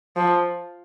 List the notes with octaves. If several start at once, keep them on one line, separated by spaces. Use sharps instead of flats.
F3